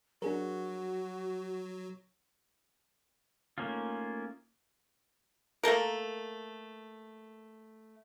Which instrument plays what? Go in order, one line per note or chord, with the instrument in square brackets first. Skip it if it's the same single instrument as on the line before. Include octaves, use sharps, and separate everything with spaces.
[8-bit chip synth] F#3 [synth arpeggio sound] D4 G#4 A#4 [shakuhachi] F#4
[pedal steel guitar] A3 A#3 C#4 D#4 F4
[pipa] A3 A#3 A4 A#4